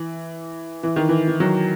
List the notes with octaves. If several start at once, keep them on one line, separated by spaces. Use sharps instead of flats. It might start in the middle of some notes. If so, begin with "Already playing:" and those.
Already playing: E3
E3
D#3
E3
E3
D#3 F#3